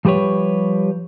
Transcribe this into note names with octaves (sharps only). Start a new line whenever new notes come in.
F3 G3 G4 B4 C#5